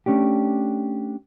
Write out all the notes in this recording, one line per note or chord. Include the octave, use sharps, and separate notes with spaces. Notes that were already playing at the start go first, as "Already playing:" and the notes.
A3 C#4 D4 G4